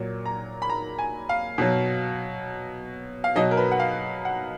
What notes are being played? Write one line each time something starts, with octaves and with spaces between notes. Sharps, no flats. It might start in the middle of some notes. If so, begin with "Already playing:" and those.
Already playing: A#2 F#3
A#5
B5
A#5
G#5
F5
B2 F#3
F5
B2 F#3 D#5
A#4
B4
F#5
F5
F#5